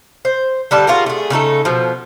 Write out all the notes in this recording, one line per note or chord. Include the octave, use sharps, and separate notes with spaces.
C5
D3 G3 B4 A5
F4 F#4 G#4 A#4
A3 G#4
C#3 A3 D#4 A4
B2 F3